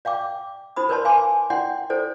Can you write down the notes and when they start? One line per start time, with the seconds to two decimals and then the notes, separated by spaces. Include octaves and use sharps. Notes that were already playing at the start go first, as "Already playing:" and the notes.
0.05 D5 F5 G5 D6
0.76 E4 C5 B5 D#6
0.89 A#4 B4 C#5 D5 A5 C6
1.05 B4 F5 G#5 C6 D6
1.50 E4 D5 F#5 G5 C6
1.90 E4 A4 C5 D5